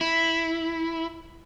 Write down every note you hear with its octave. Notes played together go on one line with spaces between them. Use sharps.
E4